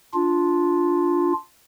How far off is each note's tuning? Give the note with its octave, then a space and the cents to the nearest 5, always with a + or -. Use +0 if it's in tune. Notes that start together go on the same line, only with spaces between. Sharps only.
D4 -5 F4 +0